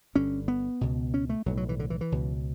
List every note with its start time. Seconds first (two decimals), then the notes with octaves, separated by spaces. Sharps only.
0.15 G1 G2 D3 C#4
0.48 B3
0.81 C#2 B2
1.14 C#4
1.30 A3
1.46 B1 F#3
1.50 A2
1.57 F#3
1.69 E3
1.79 D3
1.90 E3
2.01 E3
2.12 C#2 B2